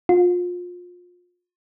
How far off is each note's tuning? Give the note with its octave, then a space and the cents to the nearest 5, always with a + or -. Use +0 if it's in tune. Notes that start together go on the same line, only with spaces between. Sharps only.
F4 +30